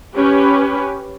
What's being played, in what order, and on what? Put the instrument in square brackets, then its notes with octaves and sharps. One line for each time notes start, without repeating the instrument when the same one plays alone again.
[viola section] C#4 G4 B4